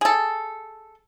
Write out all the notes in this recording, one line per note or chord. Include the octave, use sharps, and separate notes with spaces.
G#4 A4